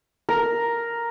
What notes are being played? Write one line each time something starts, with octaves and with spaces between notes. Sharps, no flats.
A#4